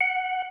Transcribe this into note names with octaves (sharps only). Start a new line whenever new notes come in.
F#5